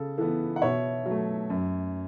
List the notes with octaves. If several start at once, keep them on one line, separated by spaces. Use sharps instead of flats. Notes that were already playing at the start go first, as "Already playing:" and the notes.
Already playing: C#3 A4
E3 B3 A4
F#5
B2 C#5 E5
F#3
A3
F#2